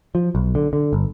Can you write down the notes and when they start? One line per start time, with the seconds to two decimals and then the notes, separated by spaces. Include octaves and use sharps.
0.15 F3
0.35 B1
0.55 D3
0.73 D3
0.93 G1